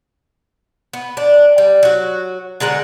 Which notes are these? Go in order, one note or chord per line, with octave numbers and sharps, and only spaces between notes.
B3
D4
G3
F#3 F#4
D3 G#3 A#4 F#5